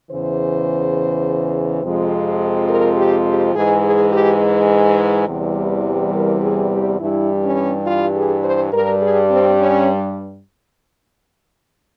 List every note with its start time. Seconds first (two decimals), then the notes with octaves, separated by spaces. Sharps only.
0.10 E2 C#3 E3 C5
1.83 F2 C3 F3 G#3
2.69 A#4
2.98 G4
3.27 G4
3.55 G#2 E3 G#3 G#4
3.84 G#4
4.12 G4
5.28 E2 C3 E3 G3
6.14 A#4
6.43 G#4
6.71 G4
7.00 G2 E3 G3 E4
7.43 C#4
7.87 F4
8.15 G#4
8.44 C5
8.73 G2 G3 A#4
9.02 G#4
9.30 C4
9.59 C#4